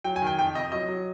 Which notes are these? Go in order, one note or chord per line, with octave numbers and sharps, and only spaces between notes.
F#3 G5
G#5
D#3 G5
F2 G5
C3 D#5
F#3 D#5
F#3